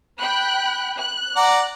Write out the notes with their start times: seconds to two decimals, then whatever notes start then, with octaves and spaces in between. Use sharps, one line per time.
0.20 G5 B5 F#6
0.99 F#6
1.36 D5 F#5 A#5